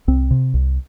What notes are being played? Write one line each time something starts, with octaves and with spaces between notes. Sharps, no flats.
C2 C4
C3
C2